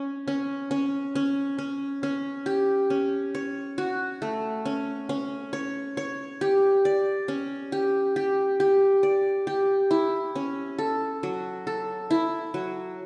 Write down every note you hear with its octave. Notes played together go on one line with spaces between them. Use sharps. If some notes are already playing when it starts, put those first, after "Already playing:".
Already playing: C#4
C#4
C#4
C#4
C#4
C#4
G4
C#4
C#5
F#4
A3
C#4
C#4
C#5
C#5
G4
D5
C#4
G4
G4
G4
D5
G4
E4
C#4
A4
F#3
A4
E4
F#3